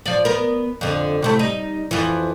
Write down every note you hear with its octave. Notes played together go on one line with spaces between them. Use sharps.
F3 D5
B3 A#4
F2 D3
C3 A3 E4
G3 D#4
F2 E3